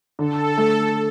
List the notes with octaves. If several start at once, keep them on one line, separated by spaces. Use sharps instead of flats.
D3 A4
A3